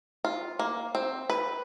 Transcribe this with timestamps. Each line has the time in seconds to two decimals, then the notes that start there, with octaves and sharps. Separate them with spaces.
0.25 F4
0.59 A#3
0.95 C4
1.30 B4